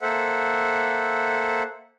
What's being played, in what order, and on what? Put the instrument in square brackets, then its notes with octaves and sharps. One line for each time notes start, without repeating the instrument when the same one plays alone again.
[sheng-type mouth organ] A#3 A4 C5 E5 F#5